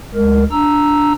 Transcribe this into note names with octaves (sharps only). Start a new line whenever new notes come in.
D2 G#3 A#4
D4 A#5 E6